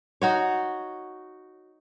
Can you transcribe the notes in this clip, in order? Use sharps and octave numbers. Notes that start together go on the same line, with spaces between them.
D#4 F#4 C#5